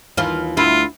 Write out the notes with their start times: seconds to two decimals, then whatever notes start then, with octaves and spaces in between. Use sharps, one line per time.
0.17 D#2 E3 F4
0.57 D2 E4 F4